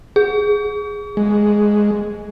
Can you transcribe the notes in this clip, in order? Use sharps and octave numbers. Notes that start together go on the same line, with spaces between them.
G#4
G#3